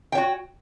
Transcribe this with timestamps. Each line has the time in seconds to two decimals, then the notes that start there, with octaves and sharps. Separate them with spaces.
0.12 G5
0.15 C#5
0.17 F#4